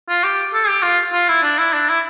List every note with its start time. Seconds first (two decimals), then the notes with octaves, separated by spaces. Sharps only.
0.09 F4
0.24 G4
0.54 A4
0.68 G4
0.83 F4
1.13 F4
1.29 E4
1.43 D4
1.59 E4
1.73 D4
1.89 E4